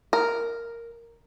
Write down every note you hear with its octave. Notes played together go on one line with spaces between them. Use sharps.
A#4